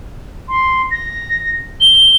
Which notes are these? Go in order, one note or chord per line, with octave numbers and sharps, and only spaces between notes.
C6
A#6
G7